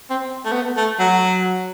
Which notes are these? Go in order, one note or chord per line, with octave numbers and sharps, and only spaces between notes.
C4
A3
B3
A3
F#3